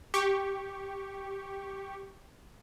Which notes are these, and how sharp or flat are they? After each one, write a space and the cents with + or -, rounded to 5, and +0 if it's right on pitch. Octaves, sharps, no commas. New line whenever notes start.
G4 +0 C#6 +0